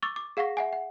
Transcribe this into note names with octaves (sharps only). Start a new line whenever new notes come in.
C#6 D6 E6 A6
D6
G#4 F5 F#5 C#6 A#6
E5 F#5 G#5
F#5